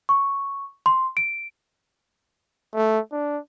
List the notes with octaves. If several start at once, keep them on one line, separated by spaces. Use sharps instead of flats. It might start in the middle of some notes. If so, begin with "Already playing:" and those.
C#6
C6
D7
A3
D4